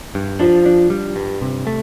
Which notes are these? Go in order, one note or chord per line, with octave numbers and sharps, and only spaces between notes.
G2
F3 D4
D4
G3
G2
C3
A3